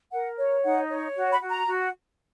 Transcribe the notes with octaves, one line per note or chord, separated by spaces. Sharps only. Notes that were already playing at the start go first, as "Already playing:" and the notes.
A#4 F#5
C#5
D#4 F#5
C#5
F#4
B5
F#4
A#5
F#4